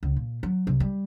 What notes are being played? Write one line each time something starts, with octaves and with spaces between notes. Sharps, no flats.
C#2
A#2
F#3
C2
G3